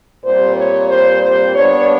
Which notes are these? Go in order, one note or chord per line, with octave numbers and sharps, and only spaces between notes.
A#2 G3 C4 C5
C#5
C5
C5
A#2 G3 B3 D4 C#5